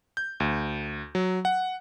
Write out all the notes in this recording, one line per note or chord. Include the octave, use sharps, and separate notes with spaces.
G6
D2
F#3
F#5